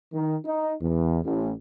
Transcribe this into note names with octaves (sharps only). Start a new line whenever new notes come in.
D#3
D#4
E2
A1